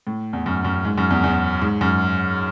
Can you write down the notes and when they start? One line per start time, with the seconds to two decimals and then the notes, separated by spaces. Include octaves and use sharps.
0.07 A2
0.33 E2
0.46 F#2
0.65 F#2
0.85 G#2
0.98 F#2
1.10 E2
1.24 E2
1.62 G#2
1.81 F#2